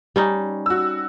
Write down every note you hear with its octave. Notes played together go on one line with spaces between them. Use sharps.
G3 C#4 D#4
F#4 E6